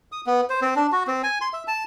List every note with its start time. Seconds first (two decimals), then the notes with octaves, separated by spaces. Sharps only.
0.12 D#6
0.26 B3
0.50 C5
0.61 C4
0.76 D4
0.92 F#4
1.07 C4
1.23 G#5
1.41 C6
1.53 E5
1.68 A5